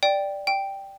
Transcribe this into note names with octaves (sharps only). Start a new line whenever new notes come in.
D5 G5
G5